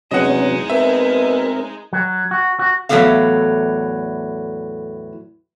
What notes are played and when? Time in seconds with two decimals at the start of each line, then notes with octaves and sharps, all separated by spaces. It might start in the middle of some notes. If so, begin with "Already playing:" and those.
0.11 E2 C3 F#3 G#3 C#4 D#4 D#5 F#5
0.70 B2 C4 A#4 E5
1.93 F#3
2.31 F#4
2.59 F#4
2.89 E2 A2 F#3 B3 A4 F5